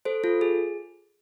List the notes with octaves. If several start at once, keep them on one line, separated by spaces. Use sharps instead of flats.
A4 C5
F4 A4
G#4